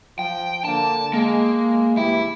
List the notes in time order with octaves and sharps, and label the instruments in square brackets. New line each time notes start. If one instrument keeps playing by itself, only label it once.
[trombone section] F3 [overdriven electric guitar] G5
[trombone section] D3 A#3 D4 [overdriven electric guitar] A5
[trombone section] G#3 [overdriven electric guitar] A#3
[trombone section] C2 E3 G4 [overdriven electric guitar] E4